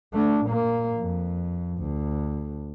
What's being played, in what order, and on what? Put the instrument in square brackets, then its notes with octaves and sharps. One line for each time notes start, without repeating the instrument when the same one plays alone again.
[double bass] A3 D4
A#2 A#3
F2
D2